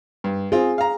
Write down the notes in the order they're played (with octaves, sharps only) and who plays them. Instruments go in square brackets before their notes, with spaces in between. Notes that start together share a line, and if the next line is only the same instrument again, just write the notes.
[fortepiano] G2
[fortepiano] C4 F4 [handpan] G#4
[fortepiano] F5 A#5